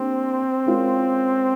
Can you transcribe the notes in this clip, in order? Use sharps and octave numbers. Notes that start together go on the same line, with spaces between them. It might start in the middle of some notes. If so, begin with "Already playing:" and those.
Already playing: A#3 C4 D4 G4
G#3 C#4 F4 A#4